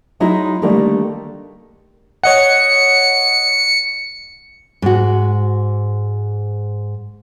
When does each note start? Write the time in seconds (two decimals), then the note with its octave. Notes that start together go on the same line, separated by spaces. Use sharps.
0.20 F#3 G#3 D#4 E4 F#4 E5
0.62 D3 D#3 G3 A3 A#3
2.23 C#5 D#5 F#5 C#7
4.82 G#2 F#4